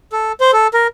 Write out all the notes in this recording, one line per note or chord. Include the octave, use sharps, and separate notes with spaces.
A4
C5
A4
A#4